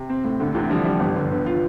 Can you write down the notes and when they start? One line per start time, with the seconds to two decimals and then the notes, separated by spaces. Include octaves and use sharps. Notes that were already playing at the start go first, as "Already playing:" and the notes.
Already playing: C3
0.10 C4
0.24 A2
0.40 D2 D3
0.55 D2 C3 E3
0.70 D3 F3 G3
0.85 G3
1.00 G1
1.16 G1 D3
1.31 D3 B3
1.46 F4